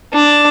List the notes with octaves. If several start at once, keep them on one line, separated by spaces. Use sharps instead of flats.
D4